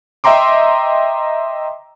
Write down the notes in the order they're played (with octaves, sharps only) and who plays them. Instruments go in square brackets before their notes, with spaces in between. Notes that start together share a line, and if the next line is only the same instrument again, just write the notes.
[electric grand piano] D#5 E5 G5 A#5 C6 D6